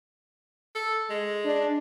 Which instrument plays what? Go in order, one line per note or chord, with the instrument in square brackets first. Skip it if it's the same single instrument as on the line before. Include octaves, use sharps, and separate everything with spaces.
[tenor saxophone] A4
G#3
[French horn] D4